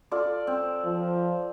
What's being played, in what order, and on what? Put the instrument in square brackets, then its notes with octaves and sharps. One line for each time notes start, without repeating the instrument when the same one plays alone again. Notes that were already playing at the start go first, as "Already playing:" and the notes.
[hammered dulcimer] F4 A4 D5
C4
[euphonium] F3